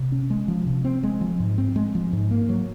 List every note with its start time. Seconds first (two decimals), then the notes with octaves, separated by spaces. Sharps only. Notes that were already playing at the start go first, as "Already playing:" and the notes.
Already playing: C3
0.12 C#4
0.30 G#3
0.48 F3
0.67 C3
0.85 C4
1.03 G#3
1.21 F3
1.40 G#2
1.58 C4
1.76 G#3
1.95 F3
2.13 G#2
2.31 A#3
2.49 F#3